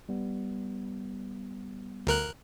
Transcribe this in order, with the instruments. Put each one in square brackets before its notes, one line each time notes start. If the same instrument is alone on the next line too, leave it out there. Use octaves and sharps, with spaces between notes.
[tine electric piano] G3 B3
[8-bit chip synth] D2 A#4 F#6